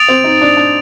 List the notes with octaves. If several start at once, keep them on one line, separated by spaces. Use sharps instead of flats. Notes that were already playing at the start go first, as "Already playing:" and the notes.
Already playing: D#6 A6 D7 F7
C4
D#4
D4
D4